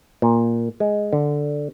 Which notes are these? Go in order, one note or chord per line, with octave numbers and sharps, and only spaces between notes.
A#2
G#3
D3